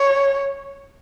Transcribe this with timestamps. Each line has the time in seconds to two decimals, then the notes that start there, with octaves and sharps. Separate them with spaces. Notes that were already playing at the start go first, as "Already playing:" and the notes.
Already playing: C#5